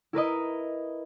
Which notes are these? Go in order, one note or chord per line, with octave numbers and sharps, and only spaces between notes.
E4 A#4 B4 D#5